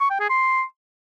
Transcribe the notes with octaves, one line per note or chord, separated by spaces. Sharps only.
C#6
G5
G#4
C6